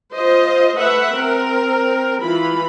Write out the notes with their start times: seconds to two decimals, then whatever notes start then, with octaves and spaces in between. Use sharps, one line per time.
0.12 F4 C5 D#5
0.75 A3 B4 E5 F#5
1.14 C4 A#4
2.20 E3 F4 B5